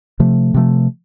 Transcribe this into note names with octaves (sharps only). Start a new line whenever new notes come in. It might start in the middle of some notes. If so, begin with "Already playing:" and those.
C3 F3 A3
C3 F3 A3